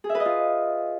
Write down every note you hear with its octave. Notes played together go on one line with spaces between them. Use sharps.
G#4
E5
B4
D#5
F4